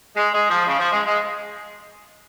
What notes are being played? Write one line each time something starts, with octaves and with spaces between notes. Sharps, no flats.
G#3
G#3
F3
C#3
F3
G#3
G#3